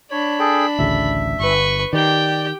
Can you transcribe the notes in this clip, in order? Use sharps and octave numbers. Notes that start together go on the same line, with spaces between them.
D4 C#5 B5
G#4 A4 G5
A1 D2 C#3 E5
G1 B4 C#6
D#3 G4 D5 G5